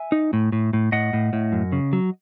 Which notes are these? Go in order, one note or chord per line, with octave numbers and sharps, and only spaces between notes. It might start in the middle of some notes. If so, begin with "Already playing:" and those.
Already playing: E5 G#5
D#4
A2
A2
A2
A2 D#5 F#5
A2
A2
F#2
C#3
F#3